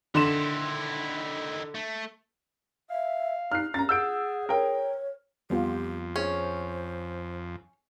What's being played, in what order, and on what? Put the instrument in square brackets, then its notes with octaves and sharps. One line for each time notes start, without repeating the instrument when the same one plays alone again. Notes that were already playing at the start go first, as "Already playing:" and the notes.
[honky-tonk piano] D3 C6 E7 [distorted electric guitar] D#3 E4
[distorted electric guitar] A3
[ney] E5 [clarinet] F5
[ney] D#4 [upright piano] F6 F#6 C7
[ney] C#4 [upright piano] A#5 A6
[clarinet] G#4 [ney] F#5 [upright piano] E6 G6 D7
[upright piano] A#4 G5 [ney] C#5
[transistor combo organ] F2 [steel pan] G3 B3 F4 [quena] G4
[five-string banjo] C#4 [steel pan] G#4 [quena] C5